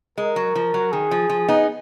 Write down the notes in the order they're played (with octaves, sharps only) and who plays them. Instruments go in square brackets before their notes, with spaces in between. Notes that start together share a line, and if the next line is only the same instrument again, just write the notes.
[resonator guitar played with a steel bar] G#3 [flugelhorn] A#4
[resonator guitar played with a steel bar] F#3
F3
F#3
[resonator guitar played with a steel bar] D#3 [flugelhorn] G#4
[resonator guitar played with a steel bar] F3
F3
B3 D#4